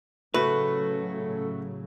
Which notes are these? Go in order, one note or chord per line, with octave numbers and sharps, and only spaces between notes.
A2 C#3 F#3 A3 F#4 A4 B4